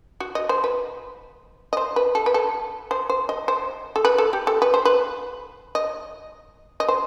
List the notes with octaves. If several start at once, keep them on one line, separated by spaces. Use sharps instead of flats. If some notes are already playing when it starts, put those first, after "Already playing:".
F#4
D#5
C5
B4
D#5
C5
B4
A4
B4
A4
C5
C5
D#5
C5
A4
B4
A4
G4
A4
B4
C5
B4
D#5
D#5
C5